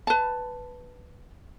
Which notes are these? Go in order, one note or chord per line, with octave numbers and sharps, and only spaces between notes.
B4 A5